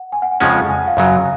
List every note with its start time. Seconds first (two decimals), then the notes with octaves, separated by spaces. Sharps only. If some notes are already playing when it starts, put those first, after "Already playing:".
Already playing: F#5
0.12 G#5
0.22 F#5
0.31 G#5
0.40 F2 C#3 F3 G#3 C#4 F#5
0.69 G#5
0.78 F#5
0.87 F5
0.97 F#2 C#3 F#3